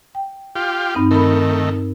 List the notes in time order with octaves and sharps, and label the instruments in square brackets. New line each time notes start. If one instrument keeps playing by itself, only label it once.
[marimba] G5
[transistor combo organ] F4 G4
[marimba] G2 C4 D#4
[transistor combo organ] D#3 A3 [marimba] A#4 B5